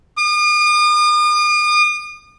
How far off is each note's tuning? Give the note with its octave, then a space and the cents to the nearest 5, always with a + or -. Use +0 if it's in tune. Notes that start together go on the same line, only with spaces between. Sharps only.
D#6 -45